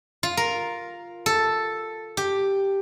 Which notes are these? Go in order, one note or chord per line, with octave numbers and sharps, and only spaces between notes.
F4
A#4
A4
G4